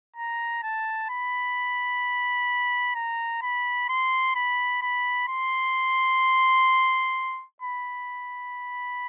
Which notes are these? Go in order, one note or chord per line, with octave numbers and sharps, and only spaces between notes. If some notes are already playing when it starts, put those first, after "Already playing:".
A#5
A5
B5
A#5
B5
C6
B5
B5
C6
B5